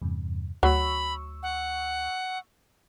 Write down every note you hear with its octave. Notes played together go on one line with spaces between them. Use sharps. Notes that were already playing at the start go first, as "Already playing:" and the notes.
E2 G2 C3
D2 F#3 B5 C#6 E6
F#5